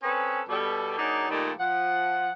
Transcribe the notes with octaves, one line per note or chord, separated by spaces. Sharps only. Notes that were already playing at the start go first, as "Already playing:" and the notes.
C4 C#4 G#4 A4 B4
B2 G3 A4
F#3 A#3 D4 D#4 G#4
A#2 D#3 G3 A3 D#4 G4
F3 F#5